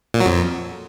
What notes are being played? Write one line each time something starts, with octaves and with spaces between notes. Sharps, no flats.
A#2
F#3
F2